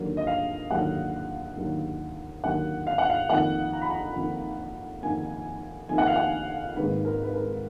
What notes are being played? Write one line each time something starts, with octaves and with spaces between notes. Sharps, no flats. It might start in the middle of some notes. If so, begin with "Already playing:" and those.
Already playing: D#2 D3 F#3 A#3
D#5
F5
D#2 D3 F#3 A#3 F#5
D#2 D3 F#3 A#3
D#2 D3 F#3 A#3 F#5
F5
F#5
F5
F2 D#3 A#3 F#5
A#5
B5
A#5
F2 D#3 A#3
F2 D#3 A#3 G#5
F2 D#3 A#3 G#5
F#5
F5
F#5
G#1 G#2 D#3 A#3 B4
A#4
B4
A#4